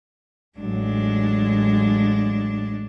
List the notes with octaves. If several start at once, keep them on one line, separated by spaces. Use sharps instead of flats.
A1 F#3 G#3 D4